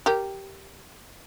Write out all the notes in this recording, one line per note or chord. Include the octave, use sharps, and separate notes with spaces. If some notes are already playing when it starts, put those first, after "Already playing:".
G4 A#4